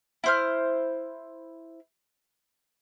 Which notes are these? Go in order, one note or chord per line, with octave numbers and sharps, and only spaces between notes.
E4 C5 F6